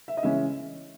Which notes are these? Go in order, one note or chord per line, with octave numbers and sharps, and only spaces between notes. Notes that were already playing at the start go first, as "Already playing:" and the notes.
E5
D#5
C#3 E3 G#3 C#4 E5